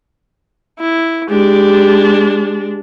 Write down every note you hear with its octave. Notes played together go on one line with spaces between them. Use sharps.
E4
G#3 D4 G4